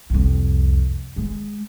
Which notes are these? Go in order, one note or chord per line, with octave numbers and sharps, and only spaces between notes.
C2 F2
G#3